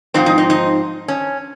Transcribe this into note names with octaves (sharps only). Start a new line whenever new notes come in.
G#2 F3 C4 D#4
D#4
D#4
D#4
C#4